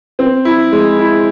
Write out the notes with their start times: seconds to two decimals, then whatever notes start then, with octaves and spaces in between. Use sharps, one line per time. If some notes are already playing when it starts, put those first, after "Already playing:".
0.19 C4
0.45 E4
0.72 G#3
0.98 E4